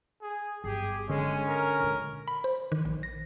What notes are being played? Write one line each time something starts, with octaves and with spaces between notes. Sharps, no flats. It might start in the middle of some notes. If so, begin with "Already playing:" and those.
G#4
G1 G4 G#4
D3 G#3 C#4
A#4
A#2 G#3
B5
C5
D#3
A#1
A#6